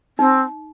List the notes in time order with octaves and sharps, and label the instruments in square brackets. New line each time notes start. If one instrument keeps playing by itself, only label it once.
[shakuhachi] C4 [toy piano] D#4